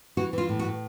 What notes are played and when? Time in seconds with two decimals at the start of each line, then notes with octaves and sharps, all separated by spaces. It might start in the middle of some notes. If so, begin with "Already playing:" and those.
0.17 E3 F#4
0.33 E3 F4
0.49 A2
0.59 F#4
0.65 A2